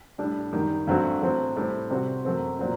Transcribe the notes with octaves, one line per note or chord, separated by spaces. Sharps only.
A2 G3 D4
F#2 D#3 G3
G2 F#3 A3 C4 F#4
A2 F#3 C4
A2 G3 C4
C3 G3 C4 F#4
F#2 F#3 A3 C4
A#2 F#3 C4